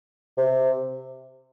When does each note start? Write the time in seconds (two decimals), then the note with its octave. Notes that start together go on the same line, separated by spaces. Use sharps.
0.37 C3